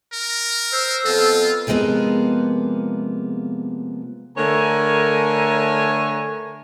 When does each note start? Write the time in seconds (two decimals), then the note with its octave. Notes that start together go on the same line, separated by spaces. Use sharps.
0.13 A#4
0.72 C5 E6
1.05 F2 B3 F4 A4
1.67 C3 F3 G#3 A#3 B3
4.38 D3 A3 A#4 C#5 G#5 A#5